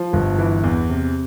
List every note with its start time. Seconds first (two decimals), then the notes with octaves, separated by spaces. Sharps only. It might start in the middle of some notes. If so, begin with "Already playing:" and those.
Already playing: F3
0.13 G1
0.39 E3
0.64 E2
0.89 C3